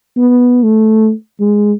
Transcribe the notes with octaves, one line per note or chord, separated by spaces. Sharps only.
B3
A3
G#3